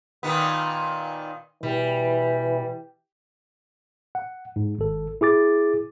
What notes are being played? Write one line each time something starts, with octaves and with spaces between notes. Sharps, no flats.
A#2 D#3 B3
B2 E3 G3
F#5
G#2
G#1 A4
E4 G#4 D6 A6